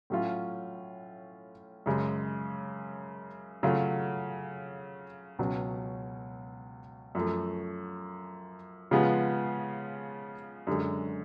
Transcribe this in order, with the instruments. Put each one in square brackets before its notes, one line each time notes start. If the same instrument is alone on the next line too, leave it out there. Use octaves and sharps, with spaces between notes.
[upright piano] A2 F#3 C#4 F4
F#2 C#3 G#3
C#3 F#3 A3 F4
C#2 B2 F#3 C#4
F#2 F3 A3
C#3 F3 G#3 B3 F4
F#2 D3 G#3